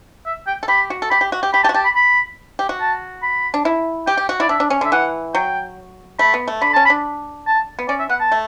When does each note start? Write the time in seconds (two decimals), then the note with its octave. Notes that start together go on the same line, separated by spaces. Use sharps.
0.26 E5
0.47 G5
0.63 A4
0.68 G4 B5
0.90 F#4
1.02 A4
1.10 G4 B5
1.21 G4
1.32 F#4
1.43 G4
1.53 G4 B5
1.63 G4 A5
1.69 F#4
1.74 G4 A5
1.85 B5
1.96 B5
2.59 G4
2.69 F#4
2.81 A5
3.23 B5
3.54 D4
3.65 E4
4.07 G4 G5
4.17 G4
4.29 F#4
4.40 E4 D5
4.49 D4 E5
4.60 D4
4.70 C#4
4.81 D3 E5
4.92 E3 F#5
5.35 F#3 G5
6.19 A3 B5
6.34 B3
6.48 A3
6.62 D3 B5
6.73 C#4 A5
6.85 B5
6.90 D4
7.47 A5
7.79 B3
7.88 C#4 D5
7.99 E5
8.09 B3 F#5
8.20 A5
8.32 A3